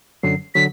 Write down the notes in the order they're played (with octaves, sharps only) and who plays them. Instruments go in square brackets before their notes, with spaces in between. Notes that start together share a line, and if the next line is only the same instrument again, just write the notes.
[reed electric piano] F#2 D3 F#3 [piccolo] C7
[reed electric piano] D3 F#3 [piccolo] B6